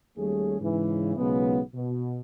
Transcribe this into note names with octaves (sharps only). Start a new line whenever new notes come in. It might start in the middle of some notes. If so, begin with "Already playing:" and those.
D#2 G3 A3 C#4 G#4
G#2 C#3 E3
B1 C#3 G#3 B3
B2